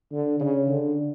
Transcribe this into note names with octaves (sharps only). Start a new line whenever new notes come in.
D3
C#3
D3